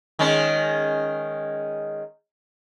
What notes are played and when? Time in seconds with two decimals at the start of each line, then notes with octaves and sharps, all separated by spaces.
0.19 D#3 G#3 C#4